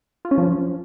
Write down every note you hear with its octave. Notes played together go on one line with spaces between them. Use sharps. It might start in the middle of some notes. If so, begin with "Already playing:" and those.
F4
C#4
F3